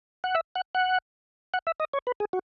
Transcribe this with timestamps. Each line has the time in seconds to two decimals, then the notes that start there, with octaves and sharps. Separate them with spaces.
0.24 F#5
0.35 E5
0.55 F#5
0.75 F#5
1.54 F#5
1.67 E5
1.80 D#5
1.93 C#5
2.07 B4
2.20 G#4
2.33 F#4